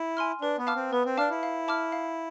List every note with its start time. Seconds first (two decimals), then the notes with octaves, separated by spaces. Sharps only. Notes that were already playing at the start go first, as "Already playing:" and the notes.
Already playing: E4
0.17 G#5 C6 F6
0.41 D4 B4
0.58 B3
0.67 F5 A5 D6 F6
0.76 C4
0.92 B3 B4
1.05 C4
1.18 D4 F5 A5 D6 F6
1.30 E4
1.43 F5
1.68 A5 D6 F6
1.92 F5